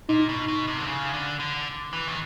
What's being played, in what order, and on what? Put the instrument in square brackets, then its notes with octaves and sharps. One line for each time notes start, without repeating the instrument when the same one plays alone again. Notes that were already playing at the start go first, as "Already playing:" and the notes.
[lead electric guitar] A#2 [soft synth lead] D#4
[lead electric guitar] B2
B2
C3
D3
C#3
D3
D3
E3
D#3